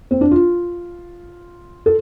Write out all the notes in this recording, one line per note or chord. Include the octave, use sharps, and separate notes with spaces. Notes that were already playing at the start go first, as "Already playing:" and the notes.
C4
D4
F4
A4